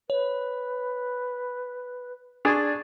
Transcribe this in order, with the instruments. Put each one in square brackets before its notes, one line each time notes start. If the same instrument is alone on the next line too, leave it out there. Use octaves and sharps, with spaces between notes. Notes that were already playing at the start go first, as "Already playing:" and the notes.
[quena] B4 [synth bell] C#5
[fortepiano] D4 G#4 D5 [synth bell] C#6 G#6 A6